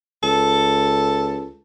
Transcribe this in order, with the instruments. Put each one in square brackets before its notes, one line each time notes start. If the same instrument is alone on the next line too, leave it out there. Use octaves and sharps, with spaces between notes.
[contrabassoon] C#2 [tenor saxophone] A4